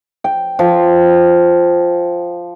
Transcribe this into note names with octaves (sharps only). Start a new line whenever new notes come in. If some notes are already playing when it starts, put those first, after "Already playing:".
G5
F3